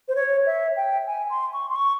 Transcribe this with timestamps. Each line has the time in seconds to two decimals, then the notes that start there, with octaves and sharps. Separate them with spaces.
0.08 C5
0.16 C#5
0.46 E5
0.77 G5
1.07 G#5
1.30 C6
1.53 C#6
1.69 C6
1.76 C#6